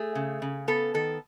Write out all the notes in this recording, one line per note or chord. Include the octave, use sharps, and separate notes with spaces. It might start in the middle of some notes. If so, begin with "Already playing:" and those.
Already playing: A3 G#4
C#3
C#3
B3 A4
D#3 A4